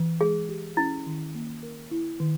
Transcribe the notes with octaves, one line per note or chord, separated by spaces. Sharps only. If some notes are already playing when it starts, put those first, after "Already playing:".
Already playing: E3
G#3 G#4
G4
C#4 E4
D#3
A#3
A#4
E4
D#3